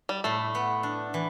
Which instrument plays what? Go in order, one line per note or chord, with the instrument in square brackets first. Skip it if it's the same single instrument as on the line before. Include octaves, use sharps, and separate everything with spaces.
[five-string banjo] G3
[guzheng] A2 [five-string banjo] A3
[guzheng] B3
D4
E3